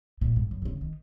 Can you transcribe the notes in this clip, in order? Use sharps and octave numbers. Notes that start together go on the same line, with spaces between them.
A#2
G#2
F#2
B2
C#3
D#3